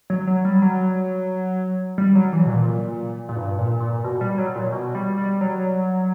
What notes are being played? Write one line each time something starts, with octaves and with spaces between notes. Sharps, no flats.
F#3
F#3
G3
F#3
G3
F#3
E3
B2
A#2
A#2
G2
A#2
A#2
B2
G3
F#3
A#2
B2
G3
G3
F#3